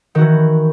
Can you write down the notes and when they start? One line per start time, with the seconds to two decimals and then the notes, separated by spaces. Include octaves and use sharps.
0.15 D#3
0.18 F#4
0.21 E3